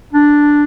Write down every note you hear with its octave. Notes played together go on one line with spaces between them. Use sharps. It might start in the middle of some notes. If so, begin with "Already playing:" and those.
D4